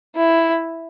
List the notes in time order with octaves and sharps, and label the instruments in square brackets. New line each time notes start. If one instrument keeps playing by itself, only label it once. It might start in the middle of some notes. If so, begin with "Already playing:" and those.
[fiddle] E4